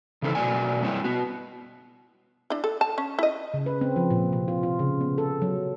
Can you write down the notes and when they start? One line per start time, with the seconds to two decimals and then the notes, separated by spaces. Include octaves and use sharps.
0.22 C#3 E3 C4 D#4 A4
0.35 B2 F#3 A3 A#3 D5 G#5
0.82 G3 C4 E4 C#5
1.04 B3 F#4
2.50 D4 E4
2.64 A4
2.81 A5
2.98 C#4
3.19 E4 D#5
3.54 C#3
3.66 B4
3.81 C4
3.96 F3
4.10 A#2
4.33 C3
4.48 F4
4.63 F4
4.79 C#3
5.01 B3
5.18 A4
5.42 F#3